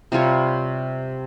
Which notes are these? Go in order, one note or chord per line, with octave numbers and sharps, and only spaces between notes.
C3 G3 F4 C#5